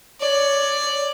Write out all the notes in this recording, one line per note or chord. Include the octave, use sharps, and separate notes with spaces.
C#5 D5